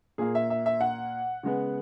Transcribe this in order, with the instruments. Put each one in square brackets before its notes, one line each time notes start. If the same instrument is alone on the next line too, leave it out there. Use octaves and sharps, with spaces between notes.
[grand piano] A#2 A#3 G#4
E5
E5
E5
F#5
C#3 G#3 B3